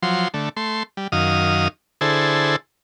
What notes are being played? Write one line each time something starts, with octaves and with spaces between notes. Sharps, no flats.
F3 F#3 C6
D3 A3
A3 C6
G3
F#2 D#3 F5 D#6
D3 E4 G#4 A4 C5